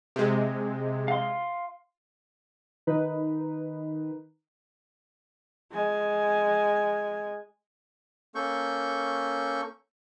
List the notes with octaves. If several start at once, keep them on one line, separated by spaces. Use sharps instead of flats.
C3 G#3
F5 C6
D#3 D#4 B4
G#3 G#5
A#3 C#4 A4 C#6 G6